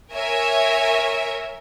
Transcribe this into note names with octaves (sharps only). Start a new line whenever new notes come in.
A#4 C#5 E5 G#5